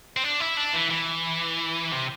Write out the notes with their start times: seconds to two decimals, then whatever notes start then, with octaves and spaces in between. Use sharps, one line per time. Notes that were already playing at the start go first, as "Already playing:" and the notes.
0.17 C4
0.24 D4
0.40 E4
0.57 D4
0.74 E3
0.91 E3
1.92 C3